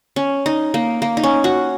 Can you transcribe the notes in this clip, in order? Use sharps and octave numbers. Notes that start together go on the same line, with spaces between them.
C#4
D#4
A#3
A#3
D#4
C#4
F#4